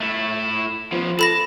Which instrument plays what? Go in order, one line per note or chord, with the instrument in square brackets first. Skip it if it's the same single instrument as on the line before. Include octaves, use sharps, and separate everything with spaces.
[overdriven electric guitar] A3 E4
F3 B3
[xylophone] A4 B5 A#6 [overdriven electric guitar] A5